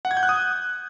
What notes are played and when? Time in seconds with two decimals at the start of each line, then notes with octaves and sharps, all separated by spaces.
0.05 F#5
0.11 G#6
0.17 G6
0.23 F#6
0.29 D#6